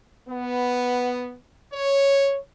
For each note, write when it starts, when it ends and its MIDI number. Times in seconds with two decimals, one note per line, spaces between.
0.29 1.34 59
1.73 2.36 73